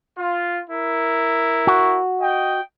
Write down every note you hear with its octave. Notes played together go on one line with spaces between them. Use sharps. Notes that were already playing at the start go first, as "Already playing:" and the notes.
F4
E4 A#4
F#4
D#5 G5